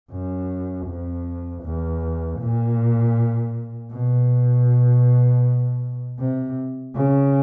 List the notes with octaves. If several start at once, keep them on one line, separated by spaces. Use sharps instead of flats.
F#2
F2
E2
A#2
B2
C3
C#3